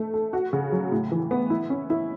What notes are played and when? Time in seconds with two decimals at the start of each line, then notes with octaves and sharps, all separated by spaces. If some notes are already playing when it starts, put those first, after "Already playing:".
Already playing: A3 A4
0.14 A4
0.33 F#4
0.53 C#3
0.72 F#3
0.92 A2
1.12 E3
1.31 B3
1.50 E4
1.70 C#4
1.90 E4